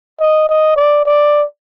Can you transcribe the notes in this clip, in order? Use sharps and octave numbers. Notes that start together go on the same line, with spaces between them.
D#5
D#5
D5
D5